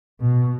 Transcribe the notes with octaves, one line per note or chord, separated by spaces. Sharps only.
B2